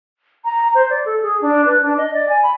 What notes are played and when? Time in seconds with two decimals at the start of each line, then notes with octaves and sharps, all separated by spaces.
0.45 A#5
0.75 C5
0.90 D5
1.05 A4
1.22 G#4
1.41 D4
1.66 B4
1.82 D4
1.97 D#5
2.14 D5
2.29 G#5
2.43 B5